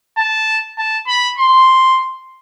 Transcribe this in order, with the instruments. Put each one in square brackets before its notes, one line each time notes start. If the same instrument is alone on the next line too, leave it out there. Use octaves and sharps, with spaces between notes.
[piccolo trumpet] A5
A5
B5
C6